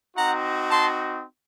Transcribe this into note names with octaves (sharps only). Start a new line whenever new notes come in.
C4 D#4 F#4 F#5 A#5
A5 C6